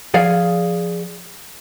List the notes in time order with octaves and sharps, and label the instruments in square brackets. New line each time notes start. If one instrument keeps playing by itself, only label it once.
[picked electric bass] F3 [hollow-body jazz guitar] G#4 D5 F5